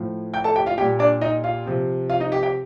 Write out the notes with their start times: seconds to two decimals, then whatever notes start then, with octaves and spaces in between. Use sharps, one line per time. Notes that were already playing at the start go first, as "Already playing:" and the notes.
Already playing: A2 F3
0.34 G5 G6
0.44 A4 A5
0.56 G4 G5
0.66 F4 F5
0.78 A#2 G3 G4 G5
0.99 D4 D5
1.21 D#4 D#5
1.44 F4 F5
1.66 C3 F3
2.09 F4 F5
2.20 D#4 D#5
2.32 G4 G5
2.43 G4 G5